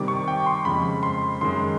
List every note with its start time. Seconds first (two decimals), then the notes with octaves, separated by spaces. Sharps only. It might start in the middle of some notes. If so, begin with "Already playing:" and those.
Already playing: C3 D#3 G3 D6
0.08 C#6
0.28 G5
0.46 C6
0.65 F2 C#3 F3 G#3 B5
1.03 C6
1.41 F#2 D#3 G#3 C6